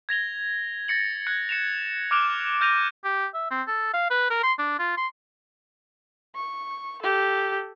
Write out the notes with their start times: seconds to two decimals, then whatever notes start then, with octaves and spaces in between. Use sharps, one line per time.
0.09 G#6 A#6 F7 G7
0.88 A6 A#6 C#7 F#7
1.27 F#6 G#6 C#7
1.49 C#7 E7 F7
2.11 D6 F6 F#6 D7 E7 F7
2.61 F6 G6 A#6 D#7 F7
3.04 G4
3.34 E5
3.51 C4
3.67 A4
3.93 F5
4.10 B4
4.30 A#4
4.43 C6
4.59 D4
4.79 F4
4.97 C6
6.35 C#6
7.02 G4 A4